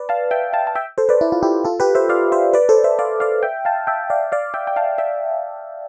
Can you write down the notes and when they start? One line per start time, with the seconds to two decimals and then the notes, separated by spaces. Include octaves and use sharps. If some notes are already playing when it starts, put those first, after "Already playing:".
Already playing: B4 D5
0.09 F5 A5
0.31 E5 G5
0.53 F5 A5
0.67 A5
0.75 E5 G5
0.98 A4 C5
1.09 B4 D5
1.21 E4
1.32 F4
1.43 E4 G4
1.65 F4 A4
1.80 G4 B4
1.95 C5 E5
2.09 D5 F5
2.32 C5 E5
2.53 B4 D5
2.69 A4 C5
2.84 C5 E5
2.99 D5 F5
3.20 D5 F5
3.43 E5 G5
3.65 F5 A5
3.87 E5 G5
4.10 D5 F5
4.32 D5 F5
4.54 E5 G5
4.67 G5
4.76 F5 A5
4.98 E5 G5